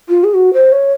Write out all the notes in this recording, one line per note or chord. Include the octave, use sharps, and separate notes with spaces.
F4
G#4
F#4
C5
C#5